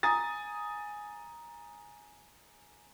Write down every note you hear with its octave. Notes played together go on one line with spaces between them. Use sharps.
G#5 A#5 D#6 A6